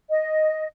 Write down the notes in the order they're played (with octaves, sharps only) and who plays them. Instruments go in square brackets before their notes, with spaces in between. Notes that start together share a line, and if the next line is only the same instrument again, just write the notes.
[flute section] D#5